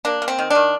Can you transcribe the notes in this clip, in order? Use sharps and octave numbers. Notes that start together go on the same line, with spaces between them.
A#3 D4
A#3
C4
D#3
D#3 D4